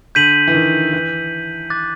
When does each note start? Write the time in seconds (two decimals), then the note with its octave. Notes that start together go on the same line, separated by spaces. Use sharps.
0.15 D3 G6 B6 D#7 F#7
0.48 E3
0.55 D#3
0.93 E3
1.70 D6 F#6 A6